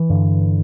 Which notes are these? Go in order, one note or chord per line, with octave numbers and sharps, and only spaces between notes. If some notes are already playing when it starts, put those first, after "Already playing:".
Already playing: E3
G2 D3